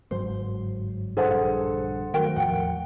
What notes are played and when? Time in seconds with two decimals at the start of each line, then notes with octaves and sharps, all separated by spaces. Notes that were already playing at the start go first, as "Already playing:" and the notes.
0.11 G1 G#2 F#3 C5
1.17 A#1 G2 D3 G#4 A4 C5 F#5
2.14 D#3 F#3 A3 F#4 A#4 G5
2.36 E2 A2 F3 F#5 G5